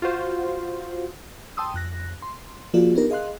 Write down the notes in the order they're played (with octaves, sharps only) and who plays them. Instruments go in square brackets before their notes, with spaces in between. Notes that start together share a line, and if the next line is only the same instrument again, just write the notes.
[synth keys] F4 F#4 C5
[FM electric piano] G5 A5 C6 D#6 E6
F2 F#6 A#6
C6
F3 A#3 F4 F#4 G#4 D5
B3 D4 D#4 G4 A#4
G#4 D#5 F5 C6 F#6